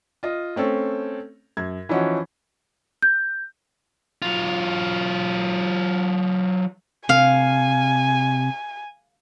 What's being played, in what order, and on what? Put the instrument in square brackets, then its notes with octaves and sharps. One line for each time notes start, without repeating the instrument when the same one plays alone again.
[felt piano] F4 D#5
A3 C4 C#4 A4
F#2 G#6
E3 F3 C#4 D#4 F#4
[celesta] G6
[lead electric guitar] F#3 F4
[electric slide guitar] C3 [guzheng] F5 [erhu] G#5